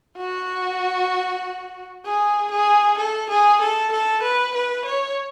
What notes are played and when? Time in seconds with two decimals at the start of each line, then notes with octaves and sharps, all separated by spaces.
0.17 F#4
2.05 G#4
2.51 G#4
2.98 A4
3.30 G#4
3.61 A4
3.92 A4
4.23 B4
4.55 B4
4.85 C#5